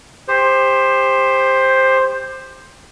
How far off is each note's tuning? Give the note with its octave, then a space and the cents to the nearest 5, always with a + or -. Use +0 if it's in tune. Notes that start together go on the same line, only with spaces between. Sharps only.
G4 +25 C5 +10